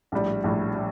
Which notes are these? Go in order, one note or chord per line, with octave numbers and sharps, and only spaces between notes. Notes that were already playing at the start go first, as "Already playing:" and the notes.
A#1 A2 G3
A#1 A2 G3
G3